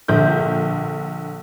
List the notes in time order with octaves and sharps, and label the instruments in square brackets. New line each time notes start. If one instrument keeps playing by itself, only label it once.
[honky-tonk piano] A#1 D3 G6